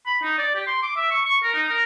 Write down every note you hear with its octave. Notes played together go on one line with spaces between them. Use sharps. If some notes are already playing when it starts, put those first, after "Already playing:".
B5
D#4
D5
G4
C6
D6
E5
C#6
C#6
A#4
D#4
A#4